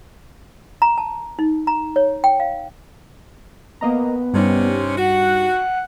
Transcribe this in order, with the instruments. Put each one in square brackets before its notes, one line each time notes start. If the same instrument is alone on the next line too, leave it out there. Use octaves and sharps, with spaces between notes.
[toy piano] A#5
A5
D#4
A#5
C#5
G5
F5
[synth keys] A#3 D#5 A#5 [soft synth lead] B3
[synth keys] G2 G3 D#4 [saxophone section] C3 C4 C#4
[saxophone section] F#4 [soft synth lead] F#5